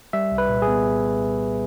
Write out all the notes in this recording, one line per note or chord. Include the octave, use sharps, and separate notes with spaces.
G3 E5
C2
B4
A#2
G#4
B3